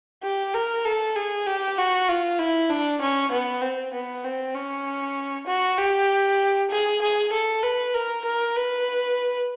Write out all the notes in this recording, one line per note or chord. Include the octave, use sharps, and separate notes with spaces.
G4
A#4
A4
G#4
G4
F#4
F4
E4
D4
C#4
B3
C4
B3
C4
C#4
F#4
G4
G#4
G#4
A4
B4
A#4
A#4
B4